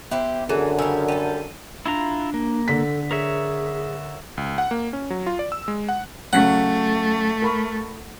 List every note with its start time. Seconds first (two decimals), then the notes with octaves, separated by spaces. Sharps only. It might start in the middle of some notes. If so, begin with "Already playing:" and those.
0.11 B3 E4 G4 C5
0.49 F#2 D3 E3 G#4 A4
0.78 C#3 G3 G#5 E6
1.08 G3 A4 D#7
1.86 D4 E4 F4 A#5
2.34 A#3
2.68 D3 A4 B6
3.11 G#4 A#4 C#5 E5
4.37 C#2
4.58 F#5
4.71 A#3
4.93 C#4
5.10 F#3
5.26 F4
5.39 D5
5.52 E6
5.68 G#3
5.89 F#5
6.33 C#3 F#3 A3 C#4 F#5
7.42 A#4 B5 C#6